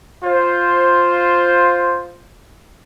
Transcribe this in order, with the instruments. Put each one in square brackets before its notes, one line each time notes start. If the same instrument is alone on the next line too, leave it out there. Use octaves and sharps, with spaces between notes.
[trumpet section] F4 C5